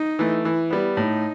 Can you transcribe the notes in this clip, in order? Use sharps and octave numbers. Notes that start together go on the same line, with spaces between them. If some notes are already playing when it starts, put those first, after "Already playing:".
Already playing: D#4
E3 A3
E3 E4
G3 B3
A2 D#4